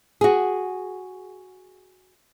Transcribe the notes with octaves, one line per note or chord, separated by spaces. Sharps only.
F#4 G#4